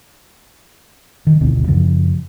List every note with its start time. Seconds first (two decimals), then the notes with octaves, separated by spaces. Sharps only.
1.27 D#3
1.41 G#1 D2 B2
1.68 F#2 C#3 F3